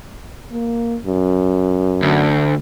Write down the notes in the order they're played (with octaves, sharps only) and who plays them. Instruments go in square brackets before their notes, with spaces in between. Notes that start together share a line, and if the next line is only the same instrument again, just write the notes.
[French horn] A#3
F#2
[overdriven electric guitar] D2